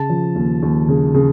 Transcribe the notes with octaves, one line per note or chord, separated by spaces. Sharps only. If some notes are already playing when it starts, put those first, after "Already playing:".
Already playing: C#3 A5
F3
D#2
D#2
C#3
C#3